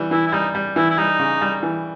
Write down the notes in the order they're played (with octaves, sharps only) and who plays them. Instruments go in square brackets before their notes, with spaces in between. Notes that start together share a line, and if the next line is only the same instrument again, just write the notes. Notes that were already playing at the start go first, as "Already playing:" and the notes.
Already playing: [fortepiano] E3 G3
[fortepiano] E3 [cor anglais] E4
[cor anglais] E4
[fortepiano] G3 [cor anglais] D#4
[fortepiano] G3
[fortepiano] E3 [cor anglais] E4
[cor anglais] E4
[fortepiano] G3 [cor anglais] D#4
[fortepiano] C#3
G3
E3